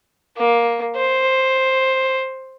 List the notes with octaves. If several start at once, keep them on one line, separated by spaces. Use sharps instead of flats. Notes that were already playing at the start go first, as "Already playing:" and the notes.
A#3
C5